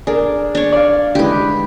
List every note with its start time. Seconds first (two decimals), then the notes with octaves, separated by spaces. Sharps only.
0.07 D4 G#4 A#4
0.55 D4 C#5
0.72 D5 F5
1.15 D3 E3 G#3 G4 B4